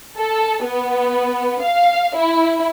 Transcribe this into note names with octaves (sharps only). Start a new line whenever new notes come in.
A4
B3
F5
E4